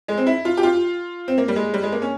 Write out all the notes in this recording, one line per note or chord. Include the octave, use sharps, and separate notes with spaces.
G#3
C4
E4
F4
G4
F4
C4
A#3
G3
G#3
G3
G#3
A#3
C#4